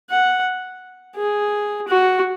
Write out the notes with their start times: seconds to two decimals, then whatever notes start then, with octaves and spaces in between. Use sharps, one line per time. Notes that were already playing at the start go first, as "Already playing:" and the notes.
0.10 F#5
1.16 G#4
1.88 F#4